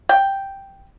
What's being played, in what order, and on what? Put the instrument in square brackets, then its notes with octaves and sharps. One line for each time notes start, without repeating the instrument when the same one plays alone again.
[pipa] G5